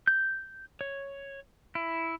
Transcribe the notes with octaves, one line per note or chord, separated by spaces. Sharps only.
G6
C#5
E4